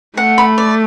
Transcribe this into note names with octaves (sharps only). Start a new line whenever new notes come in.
A3 F#5
B5
D5